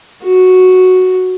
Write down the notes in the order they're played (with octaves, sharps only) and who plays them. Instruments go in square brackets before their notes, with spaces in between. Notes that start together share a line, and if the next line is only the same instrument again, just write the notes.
[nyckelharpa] F#4